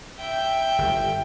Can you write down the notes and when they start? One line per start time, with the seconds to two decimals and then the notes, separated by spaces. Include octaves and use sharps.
0.17 E5 G5
0.78 G1